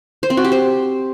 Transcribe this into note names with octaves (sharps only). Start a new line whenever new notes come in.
C5
C4
F#4
G4
C5